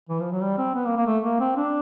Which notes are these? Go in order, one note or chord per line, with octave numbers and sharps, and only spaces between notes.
E3
F3
F#3
G3
C4
B3
A#3
A#3
A3
A#3
C4
D4